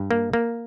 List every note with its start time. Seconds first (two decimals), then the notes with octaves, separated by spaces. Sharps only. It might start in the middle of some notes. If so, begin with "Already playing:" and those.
Already playing: G2
0.11 A#3
0.33 A#3